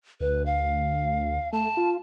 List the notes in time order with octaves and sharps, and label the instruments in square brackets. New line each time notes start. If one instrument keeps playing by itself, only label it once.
[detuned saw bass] D2 [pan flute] B4
[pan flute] F5
[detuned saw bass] A3 [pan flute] A5
[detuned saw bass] F4